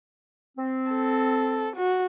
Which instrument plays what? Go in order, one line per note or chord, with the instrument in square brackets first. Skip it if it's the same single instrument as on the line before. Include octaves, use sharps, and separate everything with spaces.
[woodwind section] C4
[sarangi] A4
F#4